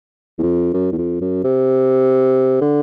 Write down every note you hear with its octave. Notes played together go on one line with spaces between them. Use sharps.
E2
F2
F#2
E2
F2
F#2
C3
D3